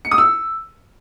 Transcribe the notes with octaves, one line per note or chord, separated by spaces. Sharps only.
C#7
D#6
E6